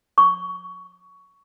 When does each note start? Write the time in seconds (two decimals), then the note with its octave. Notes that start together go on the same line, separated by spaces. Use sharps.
0.18 C#6